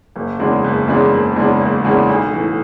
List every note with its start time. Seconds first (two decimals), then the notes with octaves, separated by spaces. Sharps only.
0.16 F#1
0.40 E2 C#3 G#3 D4
0.64 F#1
0.88 E2 C#3 G#3 D4
1.12 F#1
1.36 E2 C#3 G#3 D4
1.61 F#1
1.84 E2 C#3 G#3 D4
2.09 B1
2.33 A2 E3